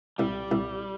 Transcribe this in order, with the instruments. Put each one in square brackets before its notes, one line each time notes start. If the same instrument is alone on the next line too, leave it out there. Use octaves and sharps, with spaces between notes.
[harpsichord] C2 [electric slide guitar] G3
[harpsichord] C2